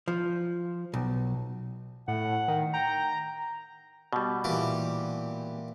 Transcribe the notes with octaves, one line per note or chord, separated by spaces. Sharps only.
F3
B1
A2 F#5
D#3
G5 A#5
B2 G3
A#2 E3 G4